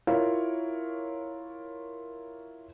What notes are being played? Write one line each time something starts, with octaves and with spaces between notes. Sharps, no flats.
E4 F4 A#4 C#5 F5